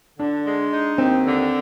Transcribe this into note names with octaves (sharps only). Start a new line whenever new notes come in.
D3 D4
G#3
D#4
D#2 C4
D3